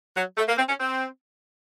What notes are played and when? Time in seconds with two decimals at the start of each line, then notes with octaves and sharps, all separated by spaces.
0.16 F#3
0.37 A3
0.48 A#3
0.58 C4
0.68 C#4
0.80 C4